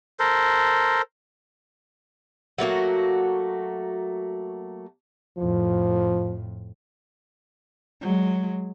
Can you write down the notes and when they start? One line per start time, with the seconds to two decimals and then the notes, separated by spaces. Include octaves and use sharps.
0.19 A4 A#4 C5
2.58 F#3 A3 A#3 F#4
5.38 F2 A2 F3
8.01 F#3 G#3